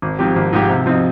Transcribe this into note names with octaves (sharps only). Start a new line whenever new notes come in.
G#1
G#2 F3 C4 G4
G#1
G#2 F3 C4 G4
C3
F3 C4 D#4